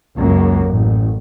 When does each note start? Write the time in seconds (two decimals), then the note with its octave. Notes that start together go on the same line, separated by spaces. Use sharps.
0.17 C#2 F#2 A#3
0.66 A1